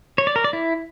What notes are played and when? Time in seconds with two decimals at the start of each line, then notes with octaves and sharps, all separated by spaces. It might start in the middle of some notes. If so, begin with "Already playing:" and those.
0.18 C#5
0.27 D5
0.36 A#4
0.44 D5
0.53 E4